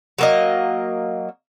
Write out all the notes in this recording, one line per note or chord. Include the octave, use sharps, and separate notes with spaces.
F#3 A#3 D#5